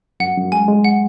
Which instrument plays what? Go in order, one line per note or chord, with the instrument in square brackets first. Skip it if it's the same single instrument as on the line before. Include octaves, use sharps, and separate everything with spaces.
[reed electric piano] F#2 [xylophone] F#5
[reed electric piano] F#2
[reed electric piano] G#3 [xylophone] G#5
[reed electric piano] G#3
[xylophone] F#5